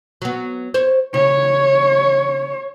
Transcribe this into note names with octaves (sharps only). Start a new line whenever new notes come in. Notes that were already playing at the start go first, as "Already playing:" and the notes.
F#3 B3
C5 C#5
C#3 C#5